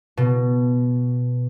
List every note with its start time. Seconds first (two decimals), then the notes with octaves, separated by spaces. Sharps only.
0.17 B2